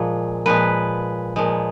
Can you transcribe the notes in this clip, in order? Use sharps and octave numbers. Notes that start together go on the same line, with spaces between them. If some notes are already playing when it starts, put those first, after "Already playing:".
Already playing: A#2 F3 G#3
A#2 F3 G#3 B4
A#2 F3 G#3